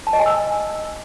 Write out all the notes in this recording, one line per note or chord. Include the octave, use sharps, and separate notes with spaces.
A5
D#5
G#5
E6